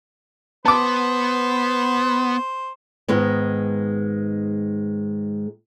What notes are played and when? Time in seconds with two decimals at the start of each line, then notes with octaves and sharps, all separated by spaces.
0.66 B3 C5 A5 D6
3.08 G#2 D#3 G#3 B3